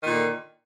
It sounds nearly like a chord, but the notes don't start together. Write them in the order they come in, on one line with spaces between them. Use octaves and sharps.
D#3 A#2 D3